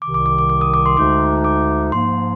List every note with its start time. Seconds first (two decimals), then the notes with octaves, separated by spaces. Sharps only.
0.02 C2 C3 D#3 D6
0.14 D6
0.26 D6
0.38 D6
0.50 D6
0.61 D#6
0.74 D6
0.86 C6
0.97 D2 D3 G#3 D#4 D6
1.44 D6
1.92 G#2 F3 A#3 C6